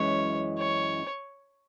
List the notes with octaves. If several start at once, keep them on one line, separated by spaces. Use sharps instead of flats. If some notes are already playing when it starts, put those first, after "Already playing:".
Already playing: F#2 E3 G#3 C#4 C#5
C#5